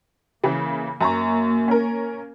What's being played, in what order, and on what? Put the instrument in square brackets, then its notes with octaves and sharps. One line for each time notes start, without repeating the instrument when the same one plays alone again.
[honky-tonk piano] C#3 E3 [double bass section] A#3
[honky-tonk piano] F#2 A#5 C#6
C#4 A#4